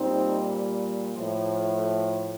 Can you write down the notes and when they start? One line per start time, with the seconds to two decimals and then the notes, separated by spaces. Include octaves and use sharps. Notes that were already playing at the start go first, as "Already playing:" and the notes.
Already playing: A#2 G3 C4 D#4
1.14 A2 F3